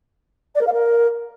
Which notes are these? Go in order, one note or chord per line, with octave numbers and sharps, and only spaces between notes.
D5
A#4
F5
A#4